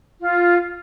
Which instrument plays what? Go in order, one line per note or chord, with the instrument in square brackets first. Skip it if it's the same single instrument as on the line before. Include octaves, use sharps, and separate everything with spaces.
[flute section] F4